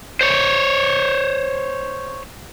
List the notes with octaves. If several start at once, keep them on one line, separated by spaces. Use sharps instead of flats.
C5 C#5